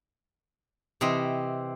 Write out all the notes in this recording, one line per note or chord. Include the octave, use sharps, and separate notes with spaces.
C3 E3 C4 D#5